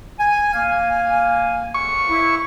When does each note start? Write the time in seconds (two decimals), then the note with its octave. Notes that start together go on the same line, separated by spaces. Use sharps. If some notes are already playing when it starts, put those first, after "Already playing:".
0.19 G#5
0.54 A#3 F5 G#5
1.74 C#6
2.09 E4